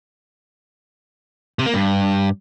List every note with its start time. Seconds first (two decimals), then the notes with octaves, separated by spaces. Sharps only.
1.59 C3
1.66 A#3
1.74 G2